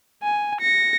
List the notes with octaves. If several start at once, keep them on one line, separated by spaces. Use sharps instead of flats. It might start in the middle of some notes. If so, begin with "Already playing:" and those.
G#5
A#6 C#7